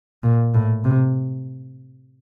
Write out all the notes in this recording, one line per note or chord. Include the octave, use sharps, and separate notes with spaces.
A#2
A2
C3